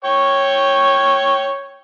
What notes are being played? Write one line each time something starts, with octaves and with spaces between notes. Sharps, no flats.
C#5 G5 C#6